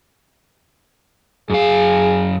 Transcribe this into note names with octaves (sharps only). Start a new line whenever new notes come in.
F#2 G#4 F5